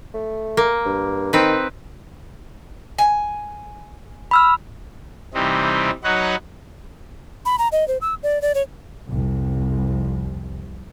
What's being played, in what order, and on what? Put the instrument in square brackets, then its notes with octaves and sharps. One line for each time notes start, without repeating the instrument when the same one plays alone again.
[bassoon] A3
[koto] A#3
[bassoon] G2
[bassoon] D#3 [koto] C4 D#4 B4
[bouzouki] G#5
[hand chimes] B5 E6 F6
[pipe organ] C3 E3 G3 C4 D#4
F#3 D#4 F#4 B4 C#5 F#5
[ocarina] B5
A#5
D#5
C5
E6
D5
D5
C#5
[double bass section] C2 F2